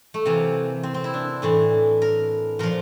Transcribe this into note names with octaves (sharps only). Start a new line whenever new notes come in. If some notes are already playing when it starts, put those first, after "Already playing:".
A3
C3 E3 A#3
C4
C4
E4
D4
A2 E3 D4
A#4
A#2 F3 A#4